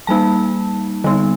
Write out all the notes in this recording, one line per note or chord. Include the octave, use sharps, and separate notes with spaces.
G3 A#3 D#4 A5
D3 G3 B3 D#4